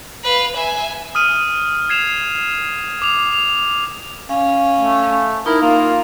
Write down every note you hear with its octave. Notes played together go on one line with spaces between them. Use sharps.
B4 F5
E5 G#5
D#6 F6 D#7
G#6 C7 E7 F7
D6 F7
F7
C#4 F5
A3
D#4 E4 A#4
A#3 F4